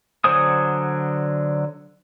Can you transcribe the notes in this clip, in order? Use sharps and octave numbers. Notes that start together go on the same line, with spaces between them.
D3 F#3 C5 G#5 D#6